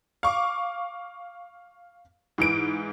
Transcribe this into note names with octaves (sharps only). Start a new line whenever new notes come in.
F5 C#6 D6
G#2 E3 D7